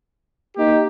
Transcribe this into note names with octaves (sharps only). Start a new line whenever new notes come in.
A#3 D#4 G4